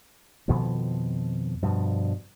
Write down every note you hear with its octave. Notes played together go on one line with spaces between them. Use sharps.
F2 B2 D#3 F3
G2 B2 F3